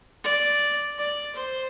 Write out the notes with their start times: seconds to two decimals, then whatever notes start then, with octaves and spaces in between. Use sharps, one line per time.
0.24 D5
0.99 D5
1.36 C5